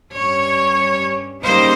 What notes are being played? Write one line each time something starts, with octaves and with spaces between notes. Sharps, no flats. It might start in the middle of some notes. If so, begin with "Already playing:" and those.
G2 G3 C#4 C#5
C#3 G3 A#3 D#4 C5